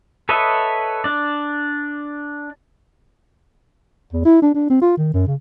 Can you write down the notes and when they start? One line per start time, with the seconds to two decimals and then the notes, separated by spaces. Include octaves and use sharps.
0.29 A4 B4 C#5 D#5 E5
1.04 D4 D5
4.13 E2
4.25 E4
4.42 D4
4.55 D4
4.70 C4
4.81 F4
4.97 D#3
5.13 F#2
5.27 C#3